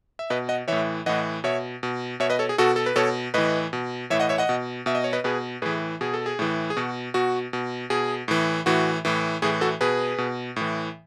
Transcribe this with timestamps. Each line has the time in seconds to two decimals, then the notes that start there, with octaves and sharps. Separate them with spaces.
0.19 E5
0.30 B2 B4 D#5
0.49 D#5 F#5
0.68 A2 E3 C#5 E5
1.06 A2 E3 D#5 F#5
1.44 B2 C#5 E5
1.83 B2
2.20 B2 C#5 E5
2.30 B4 D#5
2.39 A4 C#5
2.49 G#4
2.58 B2 F#4 A4
2.76 A4
2.86 B4
2.96 B2 A4 C#5
3.34 A2 E3 B4 D#5
3.73 B2
4.10 A2 E3 C#5 E5
4.20 D#5 F#5
4.29 C#5 E5
4.38 D#5 F#5
4.49 B2
4.86 B2 E5
4.95 D#5
5.04 C#5
5.13 B4 D#5
5.24 B2 G#4 B4
5.62 A2 E3 G#4 B4
6.01 B2 G#4
6.14 A4
6.26 G#4
6.39 A2 E3
6.70 G#4
6.77 B2 F#4
7.14 B2 F#4
7.53 B2
7.90 B2 G#4
8.28 A2 E3
8.66 A2 E3 F#4
9.05 A2 E3
9.42 A2 E3 G#4
9.61 F#4 A4
9.81 B2 G#4 B4
10.18 B2
10.56 A2 E3